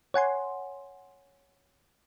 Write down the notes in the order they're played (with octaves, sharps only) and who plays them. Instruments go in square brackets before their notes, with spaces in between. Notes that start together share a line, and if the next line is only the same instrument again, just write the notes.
[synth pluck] C#5 F#5 G#5 C6